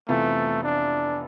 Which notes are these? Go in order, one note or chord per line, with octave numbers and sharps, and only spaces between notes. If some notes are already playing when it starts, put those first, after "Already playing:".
F1 F2 E3 A3 B3 F4
D4